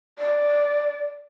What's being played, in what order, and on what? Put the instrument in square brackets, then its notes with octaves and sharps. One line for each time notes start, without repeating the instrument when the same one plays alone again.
[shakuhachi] D5